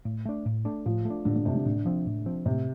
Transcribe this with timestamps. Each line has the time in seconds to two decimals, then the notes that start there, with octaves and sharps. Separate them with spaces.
0.05 A2
0.25 A3 D4
0.46 A2
0.65 A3 D4
0.86 A2 F3
1.05 A3
1.10 D4
1.25 A2 D3
1.36 D3
1.45 C3 A3 D4
1.55 D3
1.66 A2 D3
1.86 F3 C4
2.06 A2
2.26 F3 C4
2.46 A2 C3